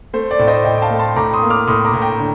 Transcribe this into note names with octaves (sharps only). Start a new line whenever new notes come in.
A3 C5
D5
A2
C5 D#5
A2 D#5 G5
G5
F5 A5
A3
A5 C6
A2 A#5 D6
C6 D#6
A#3
D6 F6
A2 C6 D#6
A#5 D6
A2
G5 A#5
D3